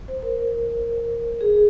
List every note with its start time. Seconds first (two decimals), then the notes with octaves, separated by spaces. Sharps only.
0.08 C5
0.23 A#4
1.41 G#4